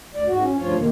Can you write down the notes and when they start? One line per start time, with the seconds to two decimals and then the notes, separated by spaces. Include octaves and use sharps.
0.15 D2 D5
0.27 G#2 F#4
0.41 C#4
0.57 D2 G2 F3 F4 C#5
0.76 F2 C3 D#3 A#3